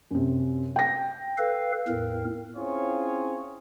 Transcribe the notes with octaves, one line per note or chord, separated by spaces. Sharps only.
F#2 C3
G5 A#6
A4 B4 F5
E2 A2 A#4
C4 C#4 E4 F4 G#4 C#5